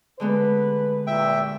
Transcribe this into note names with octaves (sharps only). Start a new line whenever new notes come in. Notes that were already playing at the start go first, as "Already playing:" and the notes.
D3 G#3 B3 B4
C2 A#2 E5 G5